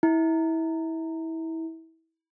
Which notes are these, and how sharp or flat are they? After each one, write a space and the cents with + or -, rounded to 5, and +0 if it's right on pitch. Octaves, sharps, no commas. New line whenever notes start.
E4 -25